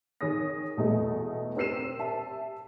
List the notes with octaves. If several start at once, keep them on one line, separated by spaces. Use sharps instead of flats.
D#3 G#4 C#5 D#6 A#6
E2 B2 A3 G#4 A4 D#5
C4 A#4 E6 C7 D#7 E7
G4 E5 A5